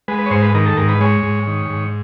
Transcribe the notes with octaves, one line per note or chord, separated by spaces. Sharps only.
G#3 B4
B4
C#5
G#2 C5
B4
D#3 A#4
A4
G#2 A#4
B4
G#3 C#5
G#2
D#3
G#2